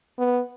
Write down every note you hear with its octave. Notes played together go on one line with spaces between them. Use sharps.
B3